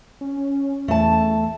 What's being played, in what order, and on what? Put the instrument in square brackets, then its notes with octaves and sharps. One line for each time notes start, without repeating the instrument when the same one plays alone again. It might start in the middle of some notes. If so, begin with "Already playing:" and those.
[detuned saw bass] C#4
[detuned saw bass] E2 [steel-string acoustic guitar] A3 A5